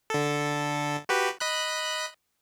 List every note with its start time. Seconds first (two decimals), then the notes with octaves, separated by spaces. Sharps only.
0.10 D3 A4
1.09 F#4 G4 B4
1.40 D#5 B5 F#6